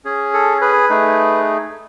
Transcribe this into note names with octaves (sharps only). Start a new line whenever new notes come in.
C#4 G#4
A4
G#4 B4
A3 D#4 G#4